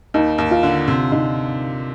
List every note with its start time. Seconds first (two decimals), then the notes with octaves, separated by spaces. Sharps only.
0.14 D#2 D#4
0.38 D#2
0.51 F4
0.63 D3
0.88 C3
1.11 C3 D#4